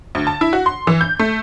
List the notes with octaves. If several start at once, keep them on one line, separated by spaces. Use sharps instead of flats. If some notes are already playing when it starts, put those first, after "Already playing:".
D2
A5
E4
F#4
C6
E3
G6
A3